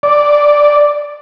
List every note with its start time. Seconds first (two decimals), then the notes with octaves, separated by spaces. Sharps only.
0.03 D5